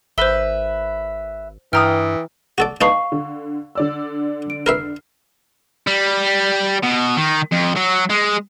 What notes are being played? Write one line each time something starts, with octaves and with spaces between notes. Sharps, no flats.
G#1 B4 C5 E5 B5 G7
G2 E3 G5 A#5 D#6 F6
F#4 A4 D5
D4 D#4 B4 F5 C#6 C7
D3
D3 D5 E6
D7
A#4 B4 E5 F6 C7
G3
B2
D#3
F2
F#3
G#3